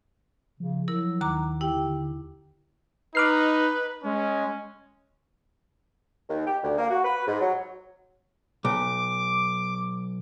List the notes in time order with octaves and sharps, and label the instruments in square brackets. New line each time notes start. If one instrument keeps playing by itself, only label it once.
[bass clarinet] C#3 [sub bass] F3
[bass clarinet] F#3 [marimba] E4 A#4
[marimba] D#2 A#5 D6 [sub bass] D#3
[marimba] E4 G5 [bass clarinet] G4
[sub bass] D3
[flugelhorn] D#4 [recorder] B4 [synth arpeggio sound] D6 F6 C7
[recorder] G#3 [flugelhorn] C#4
[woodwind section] D#2
G4
D2
A#3
F#4
B4
G#2
F#3
[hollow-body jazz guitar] B1 [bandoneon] D6